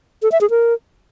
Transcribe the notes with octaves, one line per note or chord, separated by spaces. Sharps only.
A4
E5
G#4
A#4